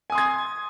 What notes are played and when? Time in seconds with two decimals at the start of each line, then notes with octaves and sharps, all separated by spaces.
0.10 G#5
0.12 D#6
0.15 C6
0.18 G#6